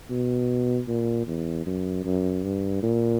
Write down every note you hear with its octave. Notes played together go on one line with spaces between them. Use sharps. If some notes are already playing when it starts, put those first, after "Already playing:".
B2
A#2
E2
F#2
F#2
G2
A#2